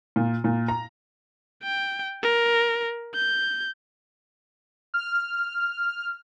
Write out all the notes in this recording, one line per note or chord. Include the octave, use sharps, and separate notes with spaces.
A#2
A#2
A#5
G5
A#4
G6
F6